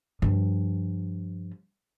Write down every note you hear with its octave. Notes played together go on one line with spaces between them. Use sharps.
G2 F3